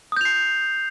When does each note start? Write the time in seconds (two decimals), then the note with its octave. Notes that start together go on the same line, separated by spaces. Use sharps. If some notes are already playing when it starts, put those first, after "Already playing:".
0.12 D#6
0.17 G6
0.21 F7
0.25 C7